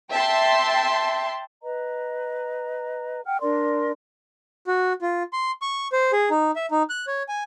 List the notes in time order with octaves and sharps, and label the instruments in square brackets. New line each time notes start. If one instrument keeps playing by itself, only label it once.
[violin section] E5 G5 A5 C6
[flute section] B4 D#5 A#5
F#5 G5 F6
D4 A#4 D5 C6
[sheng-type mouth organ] F#4
F4
C6
C#6
C5
G#4
D#4
E5
D#4
F#6
C#5
G#5